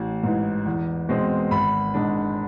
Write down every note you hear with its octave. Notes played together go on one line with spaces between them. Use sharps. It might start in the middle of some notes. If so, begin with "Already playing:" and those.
Already playing: A1
G#2 E3
E2
B2 G#3 C4
G#1 B5
G#2 G#3 D4